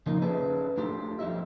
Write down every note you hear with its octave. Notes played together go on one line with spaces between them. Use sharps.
C#3 F3 A#3 D#4 F4
C#4 E4 G#4 A4 B4 D5
A3 D4 F4 G4 A4
F2 G3 E4 D#5 E5